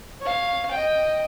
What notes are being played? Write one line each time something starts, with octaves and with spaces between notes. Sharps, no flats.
C#5 F5
D#5 G5